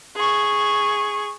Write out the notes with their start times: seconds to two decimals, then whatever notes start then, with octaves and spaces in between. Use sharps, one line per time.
0.16 G#4 C#6